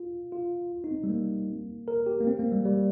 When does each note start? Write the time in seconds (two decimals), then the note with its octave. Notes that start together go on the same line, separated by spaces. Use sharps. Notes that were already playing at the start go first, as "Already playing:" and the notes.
Already playing: F4
0.32 F4
0.84 D#4
0.91 C4
1.04 G3
1.09 A#3
1.88 A#4
2.06 G4
2.20 A#3
2.27 C4
2.39 A#3
2.52 G3
2.65 G3